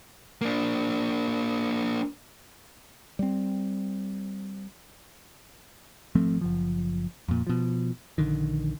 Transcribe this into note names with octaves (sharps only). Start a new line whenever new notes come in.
A#3 D4
G3 C4
G#1 F3 A3 C4
F#1 F3
F2 A#2
B2 F3
A#1 D3 D#3